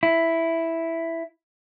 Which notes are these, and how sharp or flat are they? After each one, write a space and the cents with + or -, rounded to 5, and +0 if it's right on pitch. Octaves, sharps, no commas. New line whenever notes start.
E4 +0